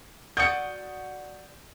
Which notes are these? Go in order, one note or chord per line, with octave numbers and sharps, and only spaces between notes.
F#4 D5 D#6 G6 C#7